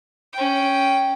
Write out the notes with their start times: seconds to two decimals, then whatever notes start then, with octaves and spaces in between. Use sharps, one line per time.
0.33 C#4 G5